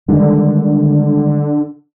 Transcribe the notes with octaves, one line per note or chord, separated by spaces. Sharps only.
D3 D#3 G3 G#3